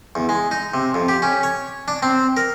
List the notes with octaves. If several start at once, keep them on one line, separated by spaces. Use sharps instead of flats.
E2
G#3
D#4
C3
F2
G4
C#4
C#5
D4
C4
A#4